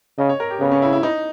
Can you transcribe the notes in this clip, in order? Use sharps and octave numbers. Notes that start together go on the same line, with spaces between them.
C#3 D#5
C#5
A#4
G4
C#3 B3
C#4
E4
E4
D#4